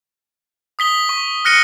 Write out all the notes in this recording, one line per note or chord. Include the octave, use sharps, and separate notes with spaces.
D#6 B6 G7
C#6
F6 F#6 A#6 C#7 D#7 G7